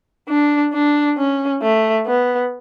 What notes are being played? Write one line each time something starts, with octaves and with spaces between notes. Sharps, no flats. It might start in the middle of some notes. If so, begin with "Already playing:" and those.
D4
D4
C#4
A3
B3